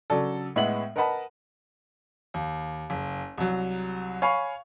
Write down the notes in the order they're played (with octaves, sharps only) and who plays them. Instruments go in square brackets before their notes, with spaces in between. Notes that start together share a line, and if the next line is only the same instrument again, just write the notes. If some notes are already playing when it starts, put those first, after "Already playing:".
[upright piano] C#3 F#3 D4 A4
A2 G#3 B3 E5 F#5 F#7
A#4 B4 D#5 F#5 A5 B5
[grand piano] D#2
F#1
C2 F#3
C#5 F5 G#5 B5 C#6